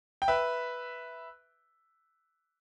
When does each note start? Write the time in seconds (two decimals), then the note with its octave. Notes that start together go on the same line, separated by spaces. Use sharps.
0.22 G5
0.28 B4 E5